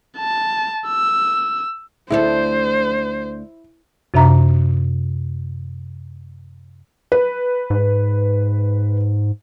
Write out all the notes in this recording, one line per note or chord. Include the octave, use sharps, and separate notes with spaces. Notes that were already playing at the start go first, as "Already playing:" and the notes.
A5
E6
D2 D4 E4 A4 C5
F#2 C3 D4 E5 A#5
B4
G#2